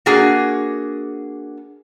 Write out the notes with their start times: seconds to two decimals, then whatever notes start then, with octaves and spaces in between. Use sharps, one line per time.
0.06 A#3 D4 F#4 G#4